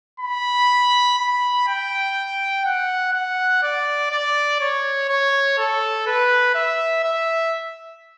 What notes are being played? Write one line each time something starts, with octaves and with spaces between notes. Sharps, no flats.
B5
B5
G5
F#5
F#5
D5
D5
C#5
C#5
A4
B4
E5
E5